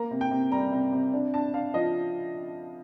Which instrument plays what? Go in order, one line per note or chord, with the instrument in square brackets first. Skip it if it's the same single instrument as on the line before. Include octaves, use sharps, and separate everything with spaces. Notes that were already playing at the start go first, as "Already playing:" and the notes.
Already playing: [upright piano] A#3 A#5
C3
G5
C3
G3 A#5
C3
C3
D4
D4 A5
D4 F5
F3 D#5